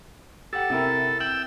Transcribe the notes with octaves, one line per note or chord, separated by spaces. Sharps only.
G4 A4 F#5
C3 E4 A#4
G5 E6 F#7